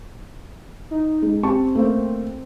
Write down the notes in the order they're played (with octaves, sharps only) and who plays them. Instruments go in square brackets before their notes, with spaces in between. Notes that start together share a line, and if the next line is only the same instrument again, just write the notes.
[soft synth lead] D#4
[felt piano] G#3
[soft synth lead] C4 [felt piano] G4 A5 C#6
[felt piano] A3 A#3 C5